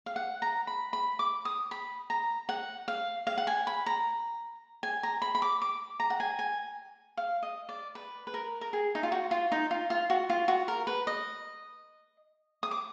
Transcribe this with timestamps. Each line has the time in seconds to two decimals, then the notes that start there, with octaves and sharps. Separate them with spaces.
0.06 F5
0.16 F#5
0.42 A#5
0.67 B5
0.93 B5
1.19 D6
1.45 D#6
1.71 B5
2.10 A#5
2.49 F#5
2.88 F5
3.27 F5
3.38 F#5
3.47 G#5
3.67 B5
3.86 A#5
4.83 G#5
5.03 A#5
5.22 B5
5.35 B5
5.42 D6
5.62 D6
6.00 A#5
6.10 F#5
6.20 G#5
6.39 G#5
7.17 F5
7.43 D#5
7.69 D5
7.95 B4
8.27 B4
8.34 A#4
8.61 A#4
8.73 G#4
8.95 D#4
9.03 F4
9.12 F#4
9.31 F4
9.52 D#4
9.71 F4
9.90 F4
10.10 F#4
10.30 F4
10.48 F#4
10.68 A#4
10.87 B4
11.07 D#5
12.63 D#6
12.71 D6